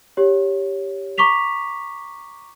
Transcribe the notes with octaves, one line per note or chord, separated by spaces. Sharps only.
G4 C#5
A#5 C#6 D6 B6 F7